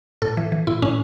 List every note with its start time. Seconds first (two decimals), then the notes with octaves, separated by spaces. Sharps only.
0.22 A2 A4
0.37 E3
0.52 E3
0.67 A2 E4
0.82 A2 C#4